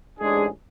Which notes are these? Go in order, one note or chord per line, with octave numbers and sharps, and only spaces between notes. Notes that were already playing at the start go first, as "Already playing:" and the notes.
A1 G#2 G#3 D4 G#4